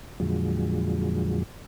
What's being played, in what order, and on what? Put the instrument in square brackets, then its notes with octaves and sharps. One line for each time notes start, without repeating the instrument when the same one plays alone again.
[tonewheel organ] F2 A#2 D3 F3 F#3 G#3